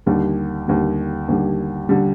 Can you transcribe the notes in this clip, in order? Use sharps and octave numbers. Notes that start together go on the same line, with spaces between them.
D#2 D3 G3
D#2 D3 G3
D#2 D3 G3
D3 G3